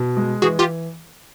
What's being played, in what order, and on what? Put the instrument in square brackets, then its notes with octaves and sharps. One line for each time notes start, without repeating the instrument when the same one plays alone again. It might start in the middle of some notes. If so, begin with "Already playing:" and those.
Already playing: [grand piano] B2
G#3
[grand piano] E3 [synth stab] F#4 G#4
[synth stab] F4 G4